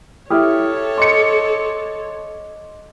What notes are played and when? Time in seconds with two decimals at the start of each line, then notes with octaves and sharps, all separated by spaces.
0.30 E4 G4 A4 C#5 D#6 F6
0.98 D#5 C6 D6 C#7